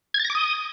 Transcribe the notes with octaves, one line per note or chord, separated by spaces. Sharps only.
G#6
A6
A#6
D6
D#6